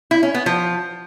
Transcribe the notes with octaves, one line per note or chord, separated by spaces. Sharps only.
E4
C#4
B3
F3